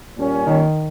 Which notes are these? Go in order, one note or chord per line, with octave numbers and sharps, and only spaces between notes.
A#2 G3 A#3 C#4
D#3